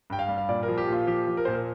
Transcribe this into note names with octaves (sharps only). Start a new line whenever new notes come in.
G2 G5
F5
G3
F5
A#2 D5
A#4
F3
G4
A#2 F4
F3 G4
F3
A#4
A#2 C5
A#4